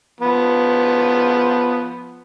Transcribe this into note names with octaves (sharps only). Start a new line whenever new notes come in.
F3 B3